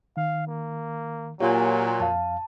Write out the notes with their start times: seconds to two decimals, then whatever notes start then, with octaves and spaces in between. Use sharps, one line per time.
0.17 D#3 F5
0.47 A#3
1.40 A#2 F#3 F4 G4 C#5 F5 G#5
2.00 F2 F5 A5